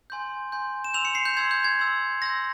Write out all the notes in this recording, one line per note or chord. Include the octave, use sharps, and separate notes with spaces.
G#5 C6 G6
G#5 C6 G6
E7
C6 E6 G6 F7
C#7
C7
G6
C6 E6 G6 G#6
G6
G#6
C6 E6 G6
C6 E6 G6 A#6